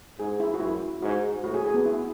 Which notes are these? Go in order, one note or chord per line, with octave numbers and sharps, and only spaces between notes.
G#2 G#4
E4
F#4
F#2 E4
G#2 F#4
A2 F#4
G#4
G#4
B3
E4